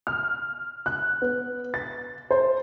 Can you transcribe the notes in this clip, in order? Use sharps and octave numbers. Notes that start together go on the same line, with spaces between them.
F6
F#6
B3
A6
C5